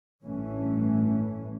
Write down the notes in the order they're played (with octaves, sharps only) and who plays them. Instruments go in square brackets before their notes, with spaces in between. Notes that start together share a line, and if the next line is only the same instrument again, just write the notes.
[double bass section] A1 G2 E3 A3 C#4